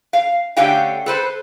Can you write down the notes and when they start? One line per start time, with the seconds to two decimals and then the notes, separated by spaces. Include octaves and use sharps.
0.13 F5
0.57 D3 A3 C#4 G4 F5 G5
1.06 A4 B4 C5